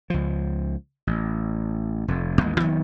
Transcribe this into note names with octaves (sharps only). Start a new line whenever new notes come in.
C#2 F3
A1
F1 F2
A1 D#2 G#3
F1 D#3 F#3 B3